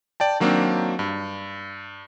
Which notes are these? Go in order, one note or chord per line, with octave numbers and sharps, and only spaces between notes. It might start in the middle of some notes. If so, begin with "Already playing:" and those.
D5 G5 A5
D#3 F#3 A#3 C4 D4
G2